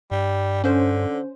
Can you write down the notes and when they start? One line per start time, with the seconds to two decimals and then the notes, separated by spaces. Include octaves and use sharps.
0.11 G2 G3
0.64 D3 C#4 C5